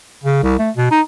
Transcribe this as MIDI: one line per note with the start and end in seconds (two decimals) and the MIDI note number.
0.24 0.39 49
0.43 0.58 36
0.59 0.70 57
0.77 0.88 47
0.91 1.01 63